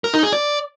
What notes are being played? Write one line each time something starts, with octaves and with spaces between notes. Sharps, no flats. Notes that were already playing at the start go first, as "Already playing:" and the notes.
A#4
D#4
G#4
D5